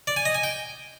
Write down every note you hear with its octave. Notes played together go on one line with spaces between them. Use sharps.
D5
G#5
D#5
G#5
G5